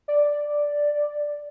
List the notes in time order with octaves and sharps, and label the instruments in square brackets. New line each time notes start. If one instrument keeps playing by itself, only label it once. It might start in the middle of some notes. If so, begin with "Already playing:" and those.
[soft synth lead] D5